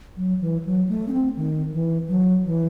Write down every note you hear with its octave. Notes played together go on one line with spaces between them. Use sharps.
F#3
E3
F#3
A3
C#4
C4
D#3
E3
F#3
E3